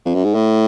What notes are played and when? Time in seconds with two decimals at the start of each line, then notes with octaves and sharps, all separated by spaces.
0.06 F2
0.15 F#2
0.24 G#2
0.35 A2